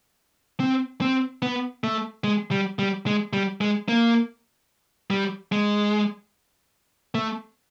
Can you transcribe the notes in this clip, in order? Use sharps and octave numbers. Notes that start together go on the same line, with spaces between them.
C4
C4
B3
A3
G#3
G3
G3
G#3
G3
G#3
A#3
G3
G#3
A3